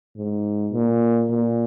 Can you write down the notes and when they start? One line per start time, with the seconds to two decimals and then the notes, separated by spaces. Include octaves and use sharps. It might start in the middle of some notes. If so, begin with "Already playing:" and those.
0.17 G#2
0.72 A#2
1.30 A#2